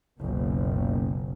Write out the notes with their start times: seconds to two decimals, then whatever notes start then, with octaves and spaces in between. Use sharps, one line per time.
0.20 F#1 C#2 B2